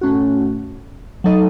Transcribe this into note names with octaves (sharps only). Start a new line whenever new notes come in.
A2 A3 C#4 F#4
F#3 A3 D#4 A4 D#5